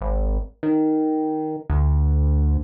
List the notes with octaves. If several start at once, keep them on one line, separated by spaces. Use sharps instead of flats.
G#1
D#3
D2